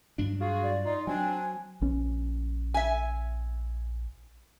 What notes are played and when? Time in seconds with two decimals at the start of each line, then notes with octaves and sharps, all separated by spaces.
0.18 G2 F#3 D4
0.40 F4 F#4 G#4
0.63 D5
0.85 D#4 F4
1.07 F#3 C4 D4 G#5
1.81 A#1 C#4
2.74 E5 G#5